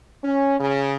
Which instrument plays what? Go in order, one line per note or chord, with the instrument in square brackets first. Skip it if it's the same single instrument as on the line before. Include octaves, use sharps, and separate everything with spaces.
[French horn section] C#4
C#3